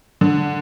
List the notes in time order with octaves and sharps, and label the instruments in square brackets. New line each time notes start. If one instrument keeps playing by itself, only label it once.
[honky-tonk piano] D3